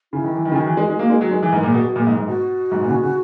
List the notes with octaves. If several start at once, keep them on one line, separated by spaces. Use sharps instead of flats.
C#3 E4
D#3
E3
D#3
C#3
D#3 F#4
E3
G#3
G#3
A#3
G#3
F#3
G#3
E3 G#4
G#2 A#4
A#2
B2 G#4
B2 F#4
A#2 G#4
G#2
G#2
B2 F#4
G#2
A#2
C#3
B2
C#3